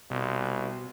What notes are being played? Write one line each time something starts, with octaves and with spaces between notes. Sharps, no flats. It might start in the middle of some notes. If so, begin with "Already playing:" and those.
C2 B2